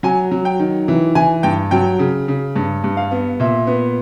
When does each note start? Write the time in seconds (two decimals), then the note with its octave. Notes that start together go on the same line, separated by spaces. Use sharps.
0.03 F#3 G#5
0.31 F#3
0.45 G5
0.59 D#3
0.88 E3
1.15 E3 G#5
1.43 G2 G5
1.71 F#3 G5
1.99 C#3
2.28 C#3
2.56 G2
2.84 G2
2.97 F5
3.11 B3
3.40 A#2 E5
3.67 B3